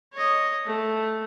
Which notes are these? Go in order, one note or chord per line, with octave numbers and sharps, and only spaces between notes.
C#5 D#5
A3